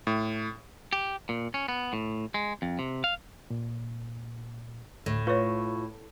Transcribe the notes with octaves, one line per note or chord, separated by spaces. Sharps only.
A2
G4
A#2
C#4
B3
A2
G#3
F2
C3
F5
A#2
D2 A2
F4 B4 C#5 C#6